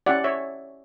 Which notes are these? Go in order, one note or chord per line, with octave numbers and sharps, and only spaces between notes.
C#4 E4 G4 D5 F#5
C#5 E5